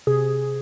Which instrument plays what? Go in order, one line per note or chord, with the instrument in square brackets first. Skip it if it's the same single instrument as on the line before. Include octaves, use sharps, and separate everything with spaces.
[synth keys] C3 G#4